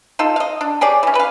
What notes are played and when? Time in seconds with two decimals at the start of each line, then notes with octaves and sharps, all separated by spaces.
0.19 D#4 F4 A4
0.36 D#5 F5
0.61 D4
0.81 G4 G#4 C#5 D5
1.03 E3 C#4
1.15 B4 F5